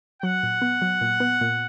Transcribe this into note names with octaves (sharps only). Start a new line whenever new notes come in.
F#3 F#5
A#2
B3
F#3
A#2
B3
A#2